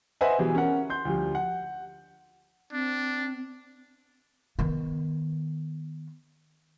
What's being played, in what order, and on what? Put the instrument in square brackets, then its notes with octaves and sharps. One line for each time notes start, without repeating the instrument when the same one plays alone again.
[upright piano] B4 C5 D#5 E5 F#5 G#5
B2 E3 G3 G#4
C#4 A#4 F#5
C6 G6
D2 F3 G3
F#5
[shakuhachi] C4 [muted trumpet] D4
[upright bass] D#3 B3